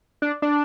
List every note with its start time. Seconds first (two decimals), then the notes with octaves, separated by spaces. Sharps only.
0.22 D4
0.42 D4